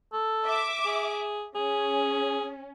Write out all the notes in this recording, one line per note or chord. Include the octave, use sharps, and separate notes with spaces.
A4
E5 D6
G#4
C#4 G#4